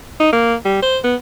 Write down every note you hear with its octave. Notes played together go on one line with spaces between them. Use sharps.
D#4
A#3
G3
C5
B3